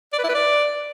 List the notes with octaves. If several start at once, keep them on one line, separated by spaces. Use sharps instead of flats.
D5
B4
E4
B4
D5